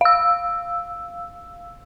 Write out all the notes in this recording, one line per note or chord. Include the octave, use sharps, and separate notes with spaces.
F5 E6